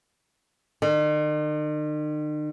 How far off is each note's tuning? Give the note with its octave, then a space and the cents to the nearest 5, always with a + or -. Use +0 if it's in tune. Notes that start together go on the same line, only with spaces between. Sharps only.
D#3 -45